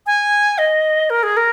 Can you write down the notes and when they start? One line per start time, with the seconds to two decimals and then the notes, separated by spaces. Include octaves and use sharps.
0.06 G#5
0.58 D#5
1.10 A#4
1.23 G#4
1.37 A#4